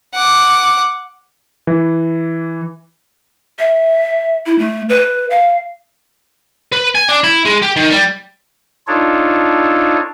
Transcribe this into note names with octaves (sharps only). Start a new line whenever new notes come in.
F#5 D6
E3
E5
E4
A3
B4
F5
B4
G#5
D4
E4
G#3
G4
D#3
G3
D4 D#4 F4 A4 C#5